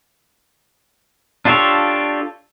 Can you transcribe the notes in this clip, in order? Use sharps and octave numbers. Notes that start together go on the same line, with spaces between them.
D4 F4 G4 A4 C#5